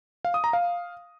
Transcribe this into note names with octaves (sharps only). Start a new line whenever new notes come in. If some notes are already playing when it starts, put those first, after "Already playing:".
F5
D#6
A#5
F5